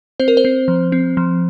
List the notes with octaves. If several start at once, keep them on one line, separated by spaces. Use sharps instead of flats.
C4 C5
A#4
C5
C4
F3
C4
F3